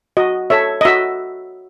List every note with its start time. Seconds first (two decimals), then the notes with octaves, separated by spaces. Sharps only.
0.17 F#4 D#5
0.50 A4 C#5 E5
0.81 D#5
0.85 F#4 E5